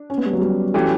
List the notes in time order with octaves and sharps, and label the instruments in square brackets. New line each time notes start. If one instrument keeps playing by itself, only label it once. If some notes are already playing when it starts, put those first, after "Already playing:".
Already playing: [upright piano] D4
[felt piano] C#4
B3
G3
F#3
G3
[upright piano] E3 A3 C#4 G4 [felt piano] F#3